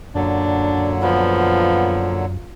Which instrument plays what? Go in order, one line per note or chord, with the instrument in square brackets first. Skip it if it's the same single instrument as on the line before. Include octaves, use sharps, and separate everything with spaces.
[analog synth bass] F#2 [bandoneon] A#2 D3 F#3 [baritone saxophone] D4
[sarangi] F3 [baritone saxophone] B3